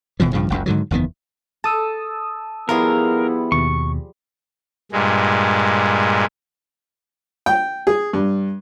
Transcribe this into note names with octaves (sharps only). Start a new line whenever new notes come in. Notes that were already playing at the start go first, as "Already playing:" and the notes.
D#1 B2 E3 F3
A#1 G2 C#3 F3
F#1 C#2 F#2
G#2 D3 D#3 F#3
F#1 E2 D#3 B3
A4 A5 D#6 E6
F3 G3 B3 E4 G#4 A#4
D#2 B2 C#6
G2 A#2 G#3
G5
G#4
G2